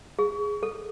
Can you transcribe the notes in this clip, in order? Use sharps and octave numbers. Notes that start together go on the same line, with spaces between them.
G#4
A4